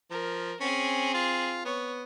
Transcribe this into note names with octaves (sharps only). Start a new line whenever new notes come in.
F3 A#4
C4 C#4 G#4
F4
B3 C#5